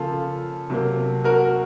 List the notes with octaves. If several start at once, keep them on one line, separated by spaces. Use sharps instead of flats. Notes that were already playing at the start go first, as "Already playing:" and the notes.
Already playing: C#3 F3 A#3 F4 A4
C3 F#3 A#3
F#4 A#4